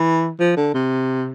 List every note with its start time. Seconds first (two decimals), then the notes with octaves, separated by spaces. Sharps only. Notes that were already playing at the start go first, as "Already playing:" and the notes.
Already playing: E3
0.40 F3
0.57 D3
0.74 C3